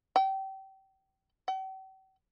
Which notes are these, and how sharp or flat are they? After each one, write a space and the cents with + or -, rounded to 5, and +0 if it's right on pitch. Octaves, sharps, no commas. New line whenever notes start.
G5 -30
G5 -45